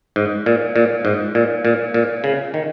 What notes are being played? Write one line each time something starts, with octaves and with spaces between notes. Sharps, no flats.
G#2
A#2
A#2
G#2
A#2
A#2
A#2
C#3
D#3